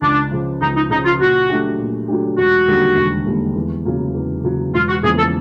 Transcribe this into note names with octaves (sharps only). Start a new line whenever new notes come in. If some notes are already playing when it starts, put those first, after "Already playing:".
C#2 D4
C#3 F3
C#2 D#4
D#4
C#3 F3 D#4
F4
A#2 F#4
F#3 A3 D4 G4
A#2
F#3 A3 D4 G4
E1 F#4
D#2 D3 G3 A#3
E1
D#2 D3 G3 A#3
E2
C#3 F#3 A#3
E2
C#3 F#3 A#3
E1 F4
F#4
E2 C#3 F3 A#3 G#4
A4